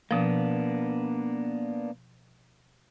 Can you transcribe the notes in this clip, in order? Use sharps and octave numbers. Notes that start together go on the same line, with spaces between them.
B2 F3 A#3 B3 D4